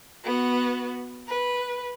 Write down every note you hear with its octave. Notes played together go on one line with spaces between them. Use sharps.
B3 F#4
B4